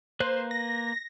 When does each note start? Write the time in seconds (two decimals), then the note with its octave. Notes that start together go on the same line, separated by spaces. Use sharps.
0.20 A#3 B4 C5 F#6
0.51 A#6